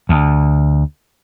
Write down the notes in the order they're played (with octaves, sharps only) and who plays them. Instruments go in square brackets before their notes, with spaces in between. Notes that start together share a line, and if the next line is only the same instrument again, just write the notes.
[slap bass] D2